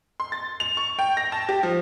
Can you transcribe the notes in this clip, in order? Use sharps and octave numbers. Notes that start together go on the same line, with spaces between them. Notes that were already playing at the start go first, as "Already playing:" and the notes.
C6
A6
F7
C#6
G5
A#6
A5
G4
F3